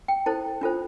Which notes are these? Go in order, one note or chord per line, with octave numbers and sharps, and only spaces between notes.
G5
E4 A4 C5 A5
D4 F4 A4 C5